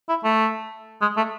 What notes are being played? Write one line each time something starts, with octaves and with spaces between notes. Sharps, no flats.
E4
A3
G#3
A3